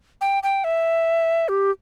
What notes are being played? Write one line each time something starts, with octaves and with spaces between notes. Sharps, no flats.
G5
G5
E5
G4